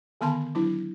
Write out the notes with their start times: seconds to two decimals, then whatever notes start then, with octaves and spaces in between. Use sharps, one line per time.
0.21 D3 D#3 B3 A5 B5 C6
0.55 F#3 D4 E4